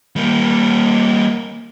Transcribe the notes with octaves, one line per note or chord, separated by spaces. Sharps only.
G3 A#3